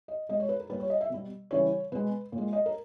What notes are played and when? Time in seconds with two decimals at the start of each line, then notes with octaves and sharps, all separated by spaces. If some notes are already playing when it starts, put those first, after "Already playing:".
0.08 D#5
0.29 B2 G#3 D#5
0.40 C#5
0.49 B4
0.60 A#4
0.70 A#2 G3 B4
0.80 C#5
0.90 D#5
1.01 E5
1.10 B2 G3
1.51 C#3 E3 G3 C#5
1.92 B2 G#3 B4
2.32 A#2
2.38 G#3
2.53 D#5
2.66 A#4